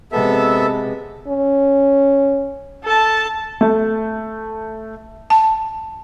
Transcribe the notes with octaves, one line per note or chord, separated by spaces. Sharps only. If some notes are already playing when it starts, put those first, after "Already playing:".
C3 G#3 B3 A4 E5
C#4
A4 A5
A3
A5